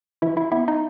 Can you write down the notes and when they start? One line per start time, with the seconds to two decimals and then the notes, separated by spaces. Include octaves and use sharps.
0.22 E3 E4 E5
0.37 E4 E5
0.52 B3 E4 E5
0.68 D#4 D#5